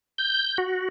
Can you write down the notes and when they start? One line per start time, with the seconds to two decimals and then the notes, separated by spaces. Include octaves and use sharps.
0.18 G6
0.58 F#4